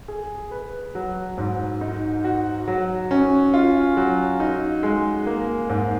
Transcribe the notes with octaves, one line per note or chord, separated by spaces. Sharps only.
G#4
B4
F#3
G#2
D#4
F#4
F#3
C#4
F4
F#3
D#4
G#3
A#3
G#2